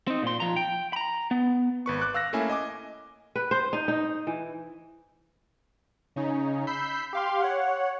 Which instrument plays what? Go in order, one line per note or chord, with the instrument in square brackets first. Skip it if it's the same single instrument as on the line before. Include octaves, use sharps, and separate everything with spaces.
[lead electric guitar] C4 D#4
A#2 C6
F3 A#5
G5
A#5 B5
B3
[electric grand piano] G#1 B4 C#6
D6 F#6
F5 E6 F#6 A#6
A3 A#3 C#4 E4 E5 G#5
D#5 G#5 D6
[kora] B4
C5
D#4
D#4
E3
[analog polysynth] C#3 C#4 D#4
B5 E6 G6 B6 C7
G4 F5 C6
C#5 F#5